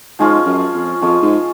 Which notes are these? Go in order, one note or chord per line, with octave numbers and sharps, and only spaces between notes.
G#2 F3 G#3 C#4 F4
F#2
F2
F2 F3 G#3 C#4 F4
G#2